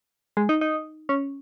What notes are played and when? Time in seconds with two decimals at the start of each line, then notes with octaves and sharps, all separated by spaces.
0.37 G#3
0.49 D#4
0.61 D#4
1.09 C#4